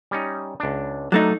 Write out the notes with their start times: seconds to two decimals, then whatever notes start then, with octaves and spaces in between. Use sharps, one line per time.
0.11 G3 C#4 D#4
0.60 C#2 D4
1.12 F#3 A3 D4 D#4 A4 A#5